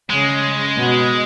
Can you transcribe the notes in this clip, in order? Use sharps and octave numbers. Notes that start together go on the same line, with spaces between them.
C#3 G#3
B2